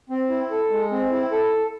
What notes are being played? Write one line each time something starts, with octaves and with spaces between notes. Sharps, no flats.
C4
E4
A4
G#3
C4
E4
A4